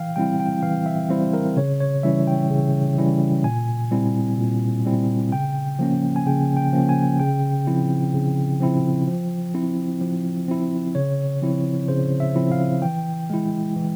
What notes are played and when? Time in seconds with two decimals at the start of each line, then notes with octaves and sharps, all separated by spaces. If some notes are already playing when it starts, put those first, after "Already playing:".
Already playing: E3 F5 G5
0.16 G3 C4 E4 G5
0.40 G5
0.63 E3 F5
0.86 E5
1.10 G3 C4 E4 C5
1.34 A#4
1.56 C#3 C#5
1.80 C#5
2.03 E3 G3 C#4 E4 E5
2.27 G5
2.51 C#3
2.98 E3 G3 C#4 E4
3.44 A#2 G#5
3.91 G3 C4 E4
4.38 A#2
4.86 G3 C4 E4
5.32 C#3 G5
5.79 F3 A#3 C#4
6.16 G#5
6.26 C#3 G5
6.57 G5
6.73 F3 A#3 C#4
6.89 G#5
7.20 C#3 G5
7.67 F3 C4 E4
8.14 C#3
8.60 F3 C4 E4
9.07 F3
9.54 C4 E4
10.01 F3
10.48 C4 E4
10.95 C#3 C#5
11.42 F3 C4 E4
11.88 C#3 C5
12.20 E5
12.35 F3 C4 E4
12.52 F5
12.82 E3 G5
13.30 G#3 E4
13.76 E3